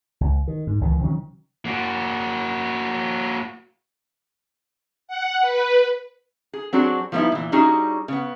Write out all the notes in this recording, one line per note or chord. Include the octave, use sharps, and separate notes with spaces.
C#2
D#3
G#2
C#2 D#3 E3
C3 D#3 F#3 C#4
A#3 F#4
F#5
B4
G#4
F#3 C4 D4 F#4 G#4
F3 G3 B3 D#4 E4
A#2 E3
G3 C#4 D#4 E4 F#4 G#4
C#3 B3